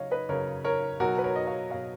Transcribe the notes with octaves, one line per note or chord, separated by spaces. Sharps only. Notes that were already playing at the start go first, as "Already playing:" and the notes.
Already playing: C#3 F#3 C#5 D#5 F5
B4 D#5
C#3 F#3 A#4 C#5
A#4 C#5
B2 F#3 F#4 A#4
B4
A#4 C#5
D#5
C#5 F5
B2 F#3 C#5 F5